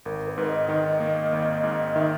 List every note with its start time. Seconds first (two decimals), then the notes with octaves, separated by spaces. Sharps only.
0.05 G#1 A#4
0.27 B4
0.38 G#2
0.48 D#5
0.69 D#3
1.00 A#3
1.32 G#1
1.64 G#2
1.95 D#3 E5